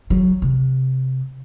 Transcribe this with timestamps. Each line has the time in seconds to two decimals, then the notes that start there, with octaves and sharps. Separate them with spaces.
0.10 F#3
0.42 C3